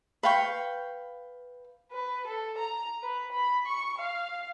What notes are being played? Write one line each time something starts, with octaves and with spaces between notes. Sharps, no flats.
B4 F5 G5 C#6
B4
A4
A#5
B4
B5
C#6
F5